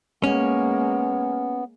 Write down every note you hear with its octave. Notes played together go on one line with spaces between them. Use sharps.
G#3 A#3 B3 C#4